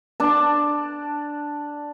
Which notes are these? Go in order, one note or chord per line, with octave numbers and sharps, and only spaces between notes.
D4 A5